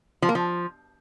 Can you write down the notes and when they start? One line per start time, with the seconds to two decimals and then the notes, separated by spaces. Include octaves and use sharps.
0.22 F3
0.29 A#3
0.35 F3